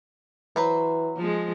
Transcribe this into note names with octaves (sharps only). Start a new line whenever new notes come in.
E3 F#3 B4 C5
F3 G#3